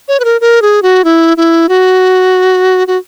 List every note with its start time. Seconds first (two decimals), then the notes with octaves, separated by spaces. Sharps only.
0.08 C#5
0.20 B4
0.25 A#4
0.41 A#4
0.62 G#4
0.83 F#4
1.04 E4
1.37 E4
1.69 F#4
2.88 F#4